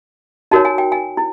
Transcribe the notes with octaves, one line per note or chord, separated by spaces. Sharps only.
D#4 F#4 A#4 C#5 A5
G#5
G5
G#5
E4